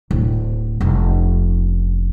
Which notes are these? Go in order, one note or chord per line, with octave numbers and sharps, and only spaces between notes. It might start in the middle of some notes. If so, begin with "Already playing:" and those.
D1
F1 C#4